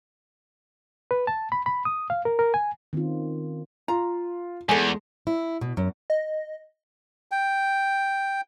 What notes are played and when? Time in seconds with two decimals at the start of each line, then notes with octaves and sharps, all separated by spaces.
1.11 B4
1.27 A5
1.52 B5
1.66 B5
1.85 D#6
2.10 F5
2.25 A#4
2.39 A#4
2.54 G#5
2.93 D#3 C4 C#4 F4
3.88 F4 A#5
4.69 E2 G#3 A4 G#5
5.27 E4
5.61 B2
5.77 F#2
6.10 D#5
7.31 G5